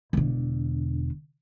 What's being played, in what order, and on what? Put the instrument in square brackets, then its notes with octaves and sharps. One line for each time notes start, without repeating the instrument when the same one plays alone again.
[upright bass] E1 D3